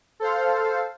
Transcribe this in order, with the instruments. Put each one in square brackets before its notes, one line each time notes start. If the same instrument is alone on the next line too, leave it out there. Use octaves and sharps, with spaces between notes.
[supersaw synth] A4 C5 F5